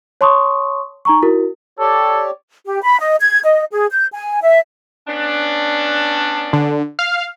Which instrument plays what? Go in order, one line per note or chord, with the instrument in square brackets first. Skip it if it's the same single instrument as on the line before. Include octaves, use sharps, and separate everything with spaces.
[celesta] C#5 A5 C6 C#6 D#6
D#4 A#5 C#6
E4 F#4 A#4
[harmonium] G4 C#5 D5 [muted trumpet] A4
[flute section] G4
B5
D#5
G#6
D#5
G#4
G6
G#5
E5
[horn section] B3 C#4 D4
[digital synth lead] D3
F5